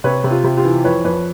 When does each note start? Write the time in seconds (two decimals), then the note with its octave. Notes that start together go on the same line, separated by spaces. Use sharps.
0.04 C3 B4 C#5
0.24 C3
0.31 F4 G4
0.44 C3
0.57 F4 G4
0.64 E3
0.84 F2 B4 C#5
1.05 F2 B4 C#5